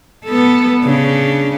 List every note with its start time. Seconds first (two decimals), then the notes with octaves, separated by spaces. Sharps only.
0.25 B3 A4
0.82 C#3 D4